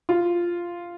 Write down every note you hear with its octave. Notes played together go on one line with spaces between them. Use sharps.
F4